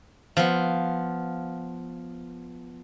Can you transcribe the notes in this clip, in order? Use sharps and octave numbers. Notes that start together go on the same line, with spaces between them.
F3 B3